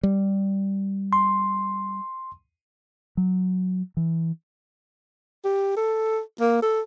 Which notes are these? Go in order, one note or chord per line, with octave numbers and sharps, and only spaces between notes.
G3
C6
F#3
E3
G4
A4
A#3
A4